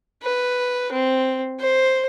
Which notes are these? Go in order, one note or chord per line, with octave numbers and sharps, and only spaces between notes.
B4
C4
C5